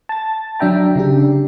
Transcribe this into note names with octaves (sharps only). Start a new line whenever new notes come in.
A5 A6
F#3 D4 E5 G5 A#5
C#3 D4 G4